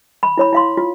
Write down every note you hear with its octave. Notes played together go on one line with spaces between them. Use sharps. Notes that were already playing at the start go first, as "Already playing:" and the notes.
B5
E4 C#5 B5
E4 F5 C6
F4